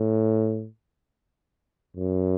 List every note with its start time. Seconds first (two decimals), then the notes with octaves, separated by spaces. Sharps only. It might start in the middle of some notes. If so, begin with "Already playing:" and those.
Already playing: A2
1.97 F#2